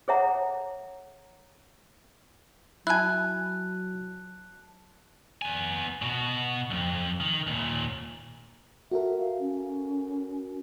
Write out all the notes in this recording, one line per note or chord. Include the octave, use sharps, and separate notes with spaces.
G#4 A4 C#5 E5 F#5 A#5
F#3 E4 G#5 A5 F#6
B3 G#5
B2 F#4
C2 F2
D#3
D#2 A#2
F#4 A4 A#4 E5
F5
C#4